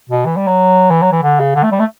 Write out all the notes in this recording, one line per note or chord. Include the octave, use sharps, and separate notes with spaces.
B2
E3
G3
F#3
E3
F#3
E3
D3
C#3
D3
A3
G3
A3